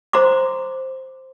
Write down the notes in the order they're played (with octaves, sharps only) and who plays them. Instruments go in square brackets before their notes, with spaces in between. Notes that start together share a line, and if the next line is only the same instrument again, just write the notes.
[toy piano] C5 A#5 C6 D6